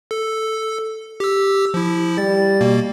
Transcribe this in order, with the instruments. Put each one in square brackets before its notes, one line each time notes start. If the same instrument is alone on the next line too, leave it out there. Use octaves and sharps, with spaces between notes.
[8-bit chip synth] A4
G4 E6
F3 E4
[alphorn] G3 [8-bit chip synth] A6
[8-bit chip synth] B2 A#3